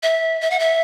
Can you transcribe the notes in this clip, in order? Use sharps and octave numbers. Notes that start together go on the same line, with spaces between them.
E5
E5
F#5
E5